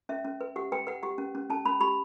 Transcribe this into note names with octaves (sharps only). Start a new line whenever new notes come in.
C#4 E5
C#4
B4
G4 F#5
B4 G5
B4 F#5
G4 F#5
C#4
C#4
C#4 A5
C#4 B5
G4 B5